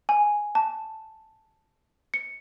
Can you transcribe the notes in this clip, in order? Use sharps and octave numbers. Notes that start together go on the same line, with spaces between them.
G#5
A5
C#7